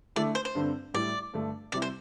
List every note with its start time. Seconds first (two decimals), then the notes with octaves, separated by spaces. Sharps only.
0.16 D3 A3 E4 D5
0.35 C5
0.45 C5
0.55 G2 D3 C4
0.94 A2 G3 E4 D5
1.34 G2 D3 A3
1.72 C3 G3 C4 E4 D5
1.82 C5